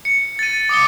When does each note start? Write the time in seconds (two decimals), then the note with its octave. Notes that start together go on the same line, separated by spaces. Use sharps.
0.05 C#7
0.39 A6 D#7
0.69 D6 D#6 C#7 G7